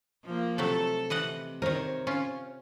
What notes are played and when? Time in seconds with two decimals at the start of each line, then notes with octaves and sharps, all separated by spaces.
0.25 F3 A#3
0.58 C3 F#3 A3 A4
1.10 C3 E3 D#5 F#5
1.62 D#3 A#4 C5 C#5
2.07 C#4 F4